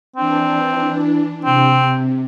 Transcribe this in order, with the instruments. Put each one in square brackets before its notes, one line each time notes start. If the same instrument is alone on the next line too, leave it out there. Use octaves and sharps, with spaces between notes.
[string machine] E3 D4 [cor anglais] C4
[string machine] C3 [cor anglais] C4